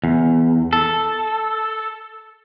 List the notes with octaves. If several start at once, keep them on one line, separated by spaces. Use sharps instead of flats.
E2
A4